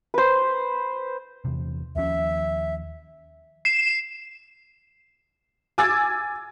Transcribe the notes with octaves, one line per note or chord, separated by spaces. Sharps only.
B4 C5
E2 C3
D#2 F3 C#4 E5
C7 E7
G#5 D6 E6 G#6 A6